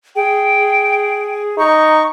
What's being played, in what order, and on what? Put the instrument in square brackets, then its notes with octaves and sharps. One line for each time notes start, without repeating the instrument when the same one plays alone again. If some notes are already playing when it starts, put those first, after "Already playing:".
[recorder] G#4 [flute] G5
[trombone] D#4 [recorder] C#6